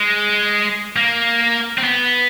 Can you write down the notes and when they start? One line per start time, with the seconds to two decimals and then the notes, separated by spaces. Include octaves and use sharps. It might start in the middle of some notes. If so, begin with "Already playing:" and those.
Already playing: G#3
0.96 A#3
1.78 C4
1.84 B3